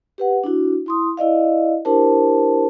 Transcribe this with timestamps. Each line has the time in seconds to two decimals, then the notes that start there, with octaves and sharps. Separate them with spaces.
0.18 G4 B4 F#5
0.44 D4 E4 F#4
0.86 E4 C6 D#6
1.17 E4 D5 D#5 F5
1.85 D4 E4 G4 A#4 C5 A5